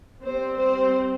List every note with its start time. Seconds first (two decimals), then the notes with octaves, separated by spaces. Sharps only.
0.23 G3 C4 C5
0.57 C5